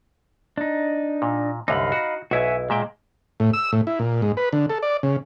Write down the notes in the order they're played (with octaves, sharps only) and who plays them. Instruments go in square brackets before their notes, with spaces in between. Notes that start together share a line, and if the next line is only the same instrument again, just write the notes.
[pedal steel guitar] D4 D#4
[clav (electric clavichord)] A#2
[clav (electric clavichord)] C2 F#2 D3 [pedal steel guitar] D#4 F5 B5
[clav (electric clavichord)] F#4
[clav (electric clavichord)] B1 E4 [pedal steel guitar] F#4 E5 G#5
[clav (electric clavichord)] A#2 E5 G5 [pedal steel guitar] G#3
[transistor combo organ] A2
E6
A2
E4
A#2
G#2
B4
D3
A4
D5
C#3